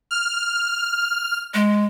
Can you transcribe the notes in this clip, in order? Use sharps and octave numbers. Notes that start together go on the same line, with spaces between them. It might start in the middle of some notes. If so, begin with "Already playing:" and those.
F6
G#3